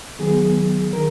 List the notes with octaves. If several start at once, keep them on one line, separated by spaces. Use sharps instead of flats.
D#3 F#3 B3 G#4
D#3 A#4